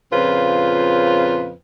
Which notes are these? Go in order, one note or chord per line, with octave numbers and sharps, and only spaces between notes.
F2 A#2 C#3 F4 B4 C5